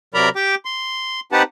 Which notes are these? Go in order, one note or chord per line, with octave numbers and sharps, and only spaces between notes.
C3 F#3 A#4 D5 A#5 B5
G4 G5 D6
C6
C4 D#4 G4 B4 F#5 A5